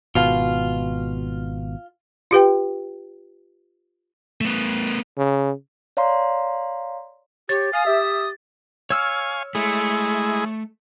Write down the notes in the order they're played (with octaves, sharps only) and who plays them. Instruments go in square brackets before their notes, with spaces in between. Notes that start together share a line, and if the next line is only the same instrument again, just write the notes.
[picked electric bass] G#1 B2 [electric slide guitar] F4
[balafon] F4 G4 B4 G5
[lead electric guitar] A3 B3
[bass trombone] C#3
[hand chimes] C#5 D5 F5 A#5 C6
[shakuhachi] G4 [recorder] C#5 [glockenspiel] A6
[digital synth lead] F5 [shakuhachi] G#5 [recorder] D#6
[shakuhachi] G4 [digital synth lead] E5
[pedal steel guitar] C#5 E6 F6 [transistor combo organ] F5 G#5 C#6
[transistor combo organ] G#3 E4 G#4 [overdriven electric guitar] A3